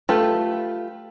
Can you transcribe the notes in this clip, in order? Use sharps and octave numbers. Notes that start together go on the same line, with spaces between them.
A3 F4 G4 B4